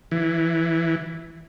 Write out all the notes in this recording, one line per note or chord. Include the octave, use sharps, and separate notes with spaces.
E3